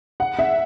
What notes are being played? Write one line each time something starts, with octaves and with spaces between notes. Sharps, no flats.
F#5
E5